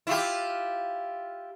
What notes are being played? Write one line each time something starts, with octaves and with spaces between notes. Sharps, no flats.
E4 F4 G4